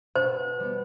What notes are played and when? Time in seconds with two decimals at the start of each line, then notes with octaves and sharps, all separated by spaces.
0.15 B2 C5
0.60 G3 B3